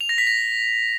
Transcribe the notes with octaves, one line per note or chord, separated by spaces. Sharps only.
F7
A#6
B6
A#6